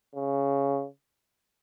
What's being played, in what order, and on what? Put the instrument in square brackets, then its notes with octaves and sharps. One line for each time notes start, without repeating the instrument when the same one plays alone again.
[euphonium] C#3